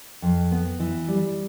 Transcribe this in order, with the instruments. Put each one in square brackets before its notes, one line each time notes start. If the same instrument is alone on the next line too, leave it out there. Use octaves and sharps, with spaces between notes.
[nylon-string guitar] F2
B3
E3
G3